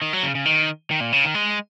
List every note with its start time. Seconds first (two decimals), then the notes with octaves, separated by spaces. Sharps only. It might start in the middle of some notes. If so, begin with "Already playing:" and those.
0.02 D#3
0.13 F#3
0.23 C#3
0.35 C#3
0.45 D#3
0.91 D#3
1.01 A#2
1.12 C#3
1.24 D#3
1.35 G#3